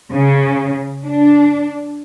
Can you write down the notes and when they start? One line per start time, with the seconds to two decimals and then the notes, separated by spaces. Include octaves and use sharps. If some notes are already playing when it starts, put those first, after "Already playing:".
0.12 C#3
1.06 D4